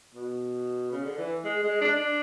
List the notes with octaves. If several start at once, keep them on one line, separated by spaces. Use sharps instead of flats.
B2
C#3
D3
E3
G#3
G#3
D4
D4